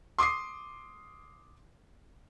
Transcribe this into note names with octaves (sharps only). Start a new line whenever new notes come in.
C6 D6 D#6 C7